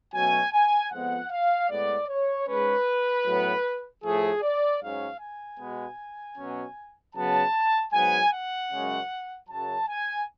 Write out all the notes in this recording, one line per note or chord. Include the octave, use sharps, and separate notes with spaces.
B2 F#3 A3 C#4 G#5
G#5
F2 F3 G#3 B3 F#5
F5
A2 G#3 B3 D5
C#5
G#2 G#3 C#4 B4
A2 F#3 B3
A2 F3 A3 G#4
D5
G#2 F#3 C#4 F5
G#5
B2 G#3 B3
B2 F#3 C#4
C#3 F#3 B3 A5
G#2 F#3 B3 G#5
F#5
F#2 C#3 G#3 C#4
F#2 C#3 F#3 A5
G#5